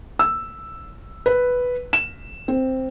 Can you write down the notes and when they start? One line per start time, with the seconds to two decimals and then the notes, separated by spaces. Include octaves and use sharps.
0.19 E6
1.26 B4
1.93 E7
2.48 C4